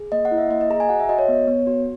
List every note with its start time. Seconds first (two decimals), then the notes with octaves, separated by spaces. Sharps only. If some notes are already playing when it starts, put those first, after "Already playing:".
Already playing: G#4
0.12 A#3 D#5
0.25 F#5
0.31 E4
0.38 E5
0.50 A#3 D#5
0.61 D#5
0.70 G#4 A#5
0.80 G#5
0.89 F#4 F#5
1.00 E5
1.09 F#4 D#5
1.19 C#5
1.28 B3
1.47 B3
1.67 F#4